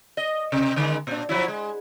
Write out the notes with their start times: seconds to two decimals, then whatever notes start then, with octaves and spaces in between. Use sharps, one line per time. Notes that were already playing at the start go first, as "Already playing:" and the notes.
0.17 D#5
0.52 C3
0.76 D3 D#3 G#3
1.07 A#2 D4
1.29 F3 F#3 E4
1.48 G#3